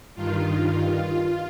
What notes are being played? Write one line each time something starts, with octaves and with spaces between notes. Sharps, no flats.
G2 D#3 F4
F4